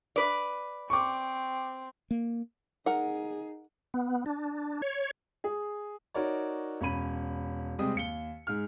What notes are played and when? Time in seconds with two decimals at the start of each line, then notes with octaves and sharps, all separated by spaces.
0.16 B4 D5
0.90 C4 C#6 D6
2.11 A#3
2.86 D#4 G#4 A#4 F#5
3.94 B3
4.26 D4
4.82 C#5
5.44 G#4
6.14 D#4 F#4 A#4 C#5 D5
6.81 E1 C#4 C#5 B5 D#7
7.79 C3 G3 G#3 C4 G5 D#6
7.95 D#2 C#7 G7
8.47 G#2 G#4 F6